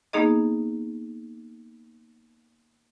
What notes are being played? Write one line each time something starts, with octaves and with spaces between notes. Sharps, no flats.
A#3 B3 D#4 G#4 D#5